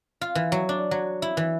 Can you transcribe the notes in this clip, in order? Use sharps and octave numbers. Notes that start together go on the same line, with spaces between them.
F4
E3
F#3
D4
F#3
E4
E3